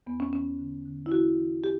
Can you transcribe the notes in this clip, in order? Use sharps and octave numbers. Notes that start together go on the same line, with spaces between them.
E2 B3
C#4
E3 C#4
D3
D3
E4
E3 F#4
E3
G4